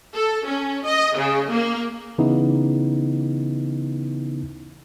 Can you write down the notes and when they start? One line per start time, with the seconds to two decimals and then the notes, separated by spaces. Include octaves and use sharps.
0.13 A4
0.46 C#4
0.85 D#5
1.17 C#3
1.51 A#3
2.18 C#3 E3 B3 D#4 E4